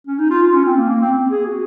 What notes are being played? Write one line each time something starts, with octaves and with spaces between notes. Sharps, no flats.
C#4
D#4
F4
F4
C#4
C4
A#3
A#3
C4
G#4
F#4